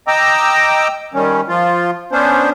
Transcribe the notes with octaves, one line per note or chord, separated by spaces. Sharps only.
D#5 G5 A#5 D6 E6
D#3 G3 C#4
F3 F4
B3 C#4 D4 C5